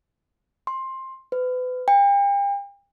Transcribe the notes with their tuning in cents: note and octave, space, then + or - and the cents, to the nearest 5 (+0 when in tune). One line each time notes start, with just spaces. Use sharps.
C6 +15
B4 +35
G5 +40